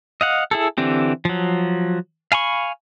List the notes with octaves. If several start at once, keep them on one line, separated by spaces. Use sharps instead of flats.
D#5 F5 F#5
E4 G#4 A4
D3 E3 C4 G4
F3 F#3
F5 G#5 B5 C#6